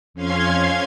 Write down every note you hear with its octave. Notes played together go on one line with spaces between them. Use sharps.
F2 C#4 F5 C6 G#6